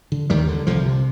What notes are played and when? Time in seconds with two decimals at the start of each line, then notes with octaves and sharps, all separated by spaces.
0.12 D3
0.30 D#2 D#3 G3
0.48 D3
0.67 C2 D3 F3
0.86 C3